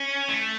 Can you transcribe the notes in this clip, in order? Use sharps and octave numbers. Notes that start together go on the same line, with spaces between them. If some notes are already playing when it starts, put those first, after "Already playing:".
Already playing: C#4
A3